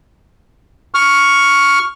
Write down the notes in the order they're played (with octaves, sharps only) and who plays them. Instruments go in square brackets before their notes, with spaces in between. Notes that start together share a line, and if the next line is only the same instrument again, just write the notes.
[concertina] C#6 F6